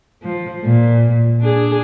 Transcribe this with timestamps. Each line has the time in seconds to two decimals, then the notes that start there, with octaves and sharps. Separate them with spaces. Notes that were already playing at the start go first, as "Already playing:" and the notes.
0.23 F3
0.64 A#2
1.40 D4 G#4